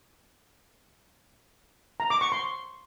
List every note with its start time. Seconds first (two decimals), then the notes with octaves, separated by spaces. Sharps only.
2.00 A#5
2.10 D6
2.21 C#6
2.32 C6